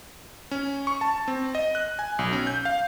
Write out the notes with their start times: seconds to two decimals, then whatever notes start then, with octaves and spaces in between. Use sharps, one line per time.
0.51 C#4
0.87 C#6
1.01 A5
1.28 C4
1.55 D#5
1.75 F#6
1.99 G#5
2.19 B1
2.33 C#4
2.47 G6
2.65 F5